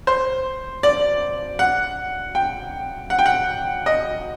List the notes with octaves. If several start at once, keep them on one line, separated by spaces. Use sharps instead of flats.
C5
D5
F#5
G5
F#5
G5
F#5
D#5